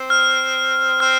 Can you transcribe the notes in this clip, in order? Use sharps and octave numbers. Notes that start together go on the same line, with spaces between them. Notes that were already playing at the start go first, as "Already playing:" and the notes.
Already playing: C4
F6
C4 F6